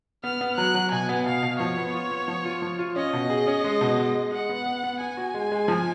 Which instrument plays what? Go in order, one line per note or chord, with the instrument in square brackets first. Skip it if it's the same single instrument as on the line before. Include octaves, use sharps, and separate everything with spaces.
[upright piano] B3 [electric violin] F6
[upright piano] B3
[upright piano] F#3 [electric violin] F#6
[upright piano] F#3
[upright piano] B2 [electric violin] G#5
[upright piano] B3
[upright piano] B2 [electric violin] F5
[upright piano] B2
[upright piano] F3 [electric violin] C#5
[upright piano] B3
F4
B3
F3
F4
F3
F4
[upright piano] C#4 [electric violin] D#5
[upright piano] B2
G#4
C#4
G#3
B2
G#3
G#3
[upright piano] G#3 [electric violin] F#5
[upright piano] B3
B3
B3
[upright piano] B3 [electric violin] G#5
[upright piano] F#4
G#3
G#3
F3